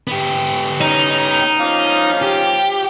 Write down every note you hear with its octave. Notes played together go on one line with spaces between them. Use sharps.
B3 G4
C#4 D#4 A#5
F3 A#3 C#4 F5
G4